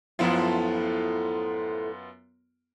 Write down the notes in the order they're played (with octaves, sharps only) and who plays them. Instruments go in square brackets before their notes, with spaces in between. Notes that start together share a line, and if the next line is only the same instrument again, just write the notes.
[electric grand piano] F#2 B3 F4 [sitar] A2 F3 E4